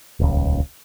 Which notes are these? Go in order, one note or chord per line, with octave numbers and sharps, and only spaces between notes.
D#1 C#2